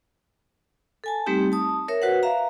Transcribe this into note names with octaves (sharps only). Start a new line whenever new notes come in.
A4 G#5 A5
G3 A3 C4 D#4 G4
A5 D#6
A#4 C#5 E5
F#4 B4 C5 F#5
E5 F5 A#5